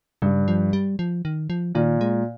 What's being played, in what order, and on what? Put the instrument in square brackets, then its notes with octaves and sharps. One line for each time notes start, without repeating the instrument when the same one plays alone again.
[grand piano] G2 [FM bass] C#3
[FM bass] F3
G3
F3
D#3
F3
[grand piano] A#2 [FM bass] D#3
[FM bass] G#3